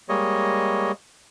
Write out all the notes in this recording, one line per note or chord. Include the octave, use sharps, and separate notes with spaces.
G3 G#3 A#3 C#5 D#5